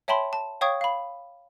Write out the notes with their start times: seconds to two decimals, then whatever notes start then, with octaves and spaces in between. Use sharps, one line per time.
0.08 C#5 E5 G5 A5 B5 C6
0.33 A5
0.61 C#5 F5 G5 C#6 D#6 G#6
0.81 F5 B5